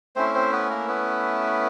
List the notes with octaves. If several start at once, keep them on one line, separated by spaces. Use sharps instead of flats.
A3 C4 C#4 E4 C5
C4 C5
B3 B4
A#3 A#4
B3 B4